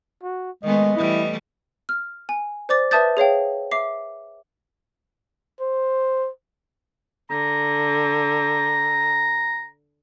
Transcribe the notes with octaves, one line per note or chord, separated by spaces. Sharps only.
F#4
D#3 G#3 A3 B3 D#5
E3 G3 A3 E4
F6
G#5
C5 D5 D6 A6
B4 E5 A5 D#6 G6 A6
G#4 C#5 F5 G5
E5 D6 C7
C5
D3 A#5